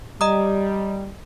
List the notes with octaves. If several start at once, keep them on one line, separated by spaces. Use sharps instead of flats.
G3 D#5 A#5 D#6